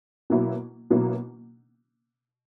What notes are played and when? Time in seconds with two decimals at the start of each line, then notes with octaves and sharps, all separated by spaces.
0.30 B2 F#3 A#3 E4
0.90 B2 F#3 A#3 E4